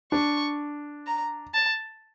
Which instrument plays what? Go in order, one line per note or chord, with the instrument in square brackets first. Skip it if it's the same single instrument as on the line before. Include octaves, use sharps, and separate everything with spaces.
[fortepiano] D4 [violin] C#6
[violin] A#5
A5